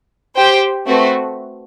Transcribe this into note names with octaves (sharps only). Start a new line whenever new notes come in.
G4 C5 G5
A3 C4 F#4 B4